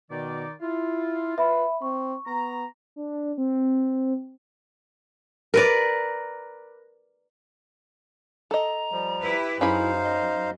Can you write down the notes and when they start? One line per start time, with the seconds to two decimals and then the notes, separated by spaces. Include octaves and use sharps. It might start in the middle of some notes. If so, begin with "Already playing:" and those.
0.11 B2 D#3 D#4 D5
0.61 E4 F4
1.38 B4 E5 B5
1.82 C4 C#6
2.27 B3 A#5
2.96 D4
3.38 C4
5.54 A#4 B4 D5
8.51 A4 D#5 A#5
8.92 F3 G3
9.21 E4 G4 B4
9.61 F#2 C#4 D#4 E4 G#4 C5 F5 B5
10.04 D#5